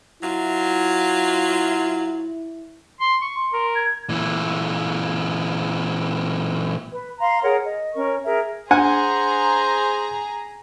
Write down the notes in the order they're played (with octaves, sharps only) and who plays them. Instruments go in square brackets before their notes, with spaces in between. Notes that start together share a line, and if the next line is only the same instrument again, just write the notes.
[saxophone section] F#3 F4 [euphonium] E4
[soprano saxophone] C6
C#6
[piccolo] C6
[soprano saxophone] A#4
[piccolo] G#6
[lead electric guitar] A#2 E3
[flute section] B4
F5 A#5 C6
G#4 A#4 C#5 F#5
D#5
C#4 A#4 C#6
G#4 A#4 E5
[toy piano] D4 [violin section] G#4 A#5 [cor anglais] C5 [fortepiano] F#5 G#5